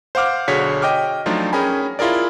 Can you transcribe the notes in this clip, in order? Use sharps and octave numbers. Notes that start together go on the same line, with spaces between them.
C5 F5 F#5 D6 F6
B1 D3 F#4 G#4 C#5 B6
D#5 G5 D6 F6
F3 F#3 A3 D4 D#4 F4
C#4 G#4 A#4 G5 G#5 B5
E4 F4 G#4 A#4 D5